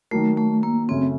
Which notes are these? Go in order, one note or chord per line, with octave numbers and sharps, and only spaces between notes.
D#3 F#3 A3 A#3
A3
A#3
F#2 C#3 A3 C4 C#4